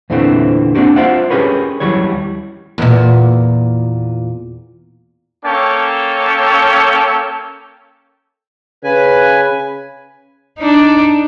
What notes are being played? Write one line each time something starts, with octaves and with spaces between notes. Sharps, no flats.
E2 A#2 D3 E3 A3 C4
A#3 C4 D4 D#4 F#4 G4
F4 C5 D5 E5 F#5
C#4 G4 G#4 A#4 B4 C#5
D#2 E3 F#3 G3 C#5
E2 A#2
A#3 C#4 A4 G5 A5
C#3 B4 G#5
D4 D#4